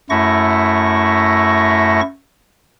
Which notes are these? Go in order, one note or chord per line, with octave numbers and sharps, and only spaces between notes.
F#2 A3 E4 C#6 A#6